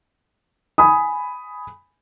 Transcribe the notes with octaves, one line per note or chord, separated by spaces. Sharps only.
G#5 B5 D#6